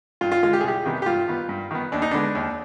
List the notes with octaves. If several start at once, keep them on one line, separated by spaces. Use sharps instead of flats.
G2 F4
F4
D3 G#3 F4
G4
G#4
C2 G4
C3 D#3 G3 B3
G4
G2 F4
D#3 B3
G2
D#3 B3
D#2 D4
D#4
D3 G#3 B3 D4
D#2